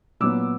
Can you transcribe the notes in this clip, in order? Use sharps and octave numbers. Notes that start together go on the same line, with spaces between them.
A#2 F#3 B3 D6 E6